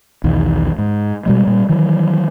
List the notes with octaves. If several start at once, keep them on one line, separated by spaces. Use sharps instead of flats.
B1 E2 D#3
G#2
B2 G3 G#3
A#2 G3
D#3 E3 F#3